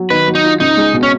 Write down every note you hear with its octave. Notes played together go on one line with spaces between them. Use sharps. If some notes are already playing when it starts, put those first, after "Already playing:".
Already playing: F#3
D#3 B4
F#3
D#4
F4
C#2 D#4
G#3
B2
C#4